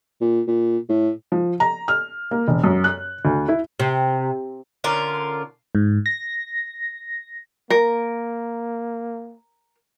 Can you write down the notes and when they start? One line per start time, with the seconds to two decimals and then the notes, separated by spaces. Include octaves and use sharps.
0.21 A#2
0.47 A#2
0.89 A2
1.32 F3
1.60 A#5
1.88 F6
2.31 A#3
2.48 E1
2.64 F#2
2.84 F#6
3.25 D2
3.48 E4
3.80 C3
4.84 D3 C#4 F4 A#4
5.75 G#2
6.06 A#6
7.70 A#3 A#4